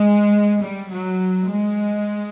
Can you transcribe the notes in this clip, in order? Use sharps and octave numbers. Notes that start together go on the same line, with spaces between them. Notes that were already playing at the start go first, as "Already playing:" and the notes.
Already playing: G#3
G3
F#3
G#3